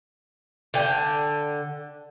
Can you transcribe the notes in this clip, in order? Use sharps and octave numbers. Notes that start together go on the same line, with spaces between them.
D3 G5